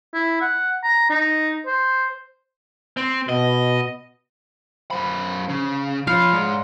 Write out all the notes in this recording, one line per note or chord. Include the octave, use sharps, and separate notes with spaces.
E4
F#5
A#5
D#4
C5
C4
B2 D#5
F#2 C5 B5
C#3
F3 C#5 F5 B5 C6
G#2 C#5 D5 C6